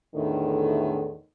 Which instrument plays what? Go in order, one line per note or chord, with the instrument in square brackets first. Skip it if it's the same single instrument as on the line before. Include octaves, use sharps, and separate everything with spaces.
[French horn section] E2 A2 D3 D#3